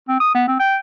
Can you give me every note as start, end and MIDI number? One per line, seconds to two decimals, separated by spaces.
0.09 0.17 60
0.20 0.32 87
0.35 0.45 59
0.48 0.55 60
0.60 0.77 79